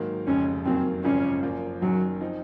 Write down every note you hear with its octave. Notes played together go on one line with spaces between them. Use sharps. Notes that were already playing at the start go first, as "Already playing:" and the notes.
Already playing: G#2 D#3 F#3 A#3
F1 F2 C#3 G#3 C#4
F#2 D#3 F#3 A#3 C4 C#4
G#1 F#2 C#3 F3 G#3 C#4
F#2 F3 A#3
F#1 F#2 D#3 F#3
F3 C4 D#4